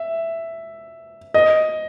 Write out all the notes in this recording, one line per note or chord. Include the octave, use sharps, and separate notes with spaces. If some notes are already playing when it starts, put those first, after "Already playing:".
Already playing: E5
D#5